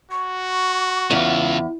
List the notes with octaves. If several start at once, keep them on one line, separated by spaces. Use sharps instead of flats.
F#4 C#6
E2 C#3 F4